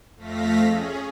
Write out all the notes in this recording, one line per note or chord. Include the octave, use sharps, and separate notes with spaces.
F2 A3 F5 A#6 B6
C#4 G#4